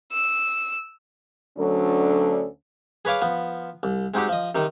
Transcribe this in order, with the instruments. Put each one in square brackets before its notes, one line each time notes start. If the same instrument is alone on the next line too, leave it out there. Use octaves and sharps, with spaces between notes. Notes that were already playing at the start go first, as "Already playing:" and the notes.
[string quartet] E6
[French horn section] D2 F#3 C#4 D4 A4
[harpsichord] G#4 B4 C#5 F5 D6
F3 B3
C2
G#3 C4 D#4 F#4 G4
F3 D#5
C3 D#3 D#4